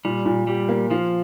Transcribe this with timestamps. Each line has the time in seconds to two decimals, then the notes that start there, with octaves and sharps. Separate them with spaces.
0.05 A#2 G3
0.26 A#2
0.47 G3 G4
0.69 A#3
0.90 F3 F4